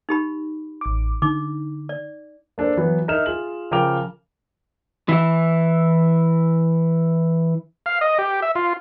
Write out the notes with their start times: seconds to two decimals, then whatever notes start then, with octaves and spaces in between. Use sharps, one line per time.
0.09 D#4 G4 B5
0.81 A1 D6
1.22 D3 D#4 D6
1.89 D5
2.58 A#3 D4 A4 C5
2.77 E3 F#3 B3
3.08 D#4 A#4 E5 F6 E7
3.26 F4 G#4 F#7
3.71 C#3 F3 A#4 G5 D6 F7
5.09 E3 E4
7.86 F5
8.01 D#5
8.18 G4
8.42 E5
8.55 F4